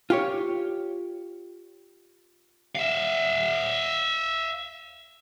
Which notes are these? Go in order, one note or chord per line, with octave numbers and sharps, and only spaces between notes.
F4 G4 C#5
E5 F5